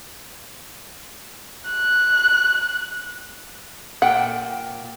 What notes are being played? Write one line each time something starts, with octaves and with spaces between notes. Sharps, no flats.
F#6
A#2 F#5 G5